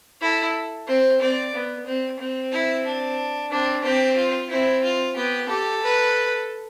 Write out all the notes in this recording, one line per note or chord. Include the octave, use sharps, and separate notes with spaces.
E4 A4
C4 C5
C4 D5
B3
C4
C4
E4
D4
C4 D4
C4 G4
F4
C4 E4
F4
B3 G4
G4 A4
B4